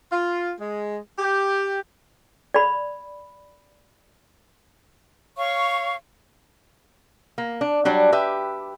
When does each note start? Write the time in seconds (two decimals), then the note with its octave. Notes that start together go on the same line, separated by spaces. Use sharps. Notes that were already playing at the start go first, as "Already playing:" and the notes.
0.12 F4
0.60 G#3
1.19 G4
2.54 D5 B5
5.37 C#5 F5 C#6
7.38 A#3
7.61 D4
7.85 F#3 G3 D4
8.12 G4 B4 E5